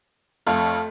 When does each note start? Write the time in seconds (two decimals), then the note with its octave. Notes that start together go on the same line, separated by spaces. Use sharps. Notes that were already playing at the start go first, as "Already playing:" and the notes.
0.47 F2 A3 C#5 F5